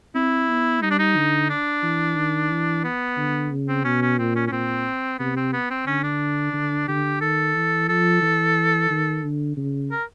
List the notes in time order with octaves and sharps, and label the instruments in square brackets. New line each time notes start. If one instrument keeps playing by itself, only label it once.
[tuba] C4 [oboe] E4
[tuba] B3
[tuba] G3 [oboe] D#4
[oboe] D4
D#4
[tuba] D3
[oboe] D4
[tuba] E3
D#3
E3
[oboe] B3
[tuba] D3
C#3
[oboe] C4
[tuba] B2 [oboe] C#4
[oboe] C#4
[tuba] A#2 [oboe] C4
[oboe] C#4
C#4
[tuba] A#2 [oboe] C4
[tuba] C3 [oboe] B3
[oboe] C4
B3
C4
[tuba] D3 [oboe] C#4
[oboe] D4
[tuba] D3
[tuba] D3 [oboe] G4
[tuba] D#3 [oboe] A4
[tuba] E3
[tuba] F3 [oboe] A4
[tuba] E3
D#3
D3
C#3
[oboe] A#4